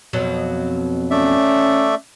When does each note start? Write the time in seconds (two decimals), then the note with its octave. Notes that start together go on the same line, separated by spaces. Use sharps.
0.13 F2 B2 F#3
1.11 A3 C#4 D5 E5